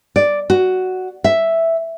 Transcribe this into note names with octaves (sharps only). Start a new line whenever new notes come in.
D5
F#4
E5